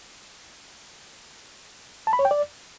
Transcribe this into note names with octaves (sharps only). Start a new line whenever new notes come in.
A5
B5
C#5
G5
D5